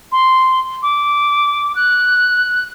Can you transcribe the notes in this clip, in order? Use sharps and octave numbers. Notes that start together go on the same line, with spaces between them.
C6
D6
F#6